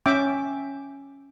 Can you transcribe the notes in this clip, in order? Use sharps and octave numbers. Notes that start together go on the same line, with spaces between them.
C#4 E5 G5 D6